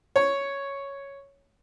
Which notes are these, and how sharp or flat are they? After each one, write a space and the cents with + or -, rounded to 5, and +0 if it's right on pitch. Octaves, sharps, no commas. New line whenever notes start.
C#5 +0